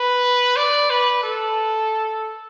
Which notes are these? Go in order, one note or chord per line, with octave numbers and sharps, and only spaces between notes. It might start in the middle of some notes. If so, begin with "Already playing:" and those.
Already playing: B4
D5
B4
A4